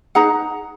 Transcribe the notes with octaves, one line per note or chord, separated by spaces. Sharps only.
D#4 G#4 B4 F#5 A#5